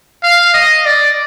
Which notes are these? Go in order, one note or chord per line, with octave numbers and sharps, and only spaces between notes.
F5
D#5
D5